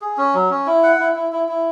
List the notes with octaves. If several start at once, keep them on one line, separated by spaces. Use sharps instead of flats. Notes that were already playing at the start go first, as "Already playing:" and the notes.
G#4
C#4
F#3
C#4
E4
F#5
E4
E4
E4
E4